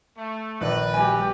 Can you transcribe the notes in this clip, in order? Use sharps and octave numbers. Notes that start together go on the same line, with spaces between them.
A3
A#1 D#3 B4 D5
G3 G4 G#5